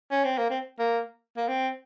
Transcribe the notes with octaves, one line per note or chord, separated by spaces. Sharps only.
C#4
C4
A#3
C4
A#3
A#3
C4